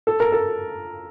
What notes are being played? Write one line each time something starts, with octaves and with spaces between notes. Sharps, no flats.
A4
A#4
A4